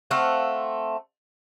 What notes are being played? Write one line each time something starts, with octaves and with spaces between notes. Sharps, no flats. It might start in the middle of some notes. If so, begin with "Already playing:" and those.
A3 C4 F5 F#5